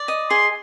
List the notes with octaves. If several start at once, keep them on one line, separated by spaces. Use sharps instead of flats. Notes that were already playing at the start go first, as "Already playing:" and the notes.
Already playing: D5
D#5
G#4 C6